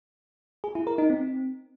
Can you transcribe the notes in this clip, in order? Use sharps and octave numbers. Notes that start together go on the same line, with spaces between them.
G#4
E4
A#4
D#4
C4